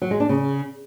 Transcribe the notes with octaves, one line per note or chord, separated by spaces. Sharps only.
F#3
G#3
D4
C#3